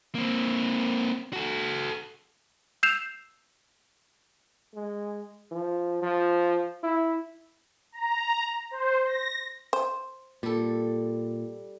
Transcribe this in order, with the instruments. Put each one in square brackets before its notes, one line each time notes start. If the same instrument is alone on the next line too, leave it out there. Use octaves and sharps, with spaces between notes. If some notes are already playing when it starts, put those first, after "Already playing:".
[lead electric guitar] A#3 C4
F#4 A4
[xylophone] E6 G6 C7 E7 F7
[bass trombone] G#3
F3
F3
E4
[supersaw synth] A#5
C5
A#6
[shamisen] C5
[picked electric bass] A#2 [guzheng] G3 A4